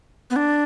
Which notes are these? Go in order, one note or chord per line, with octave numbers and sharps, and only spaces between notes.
B3
D4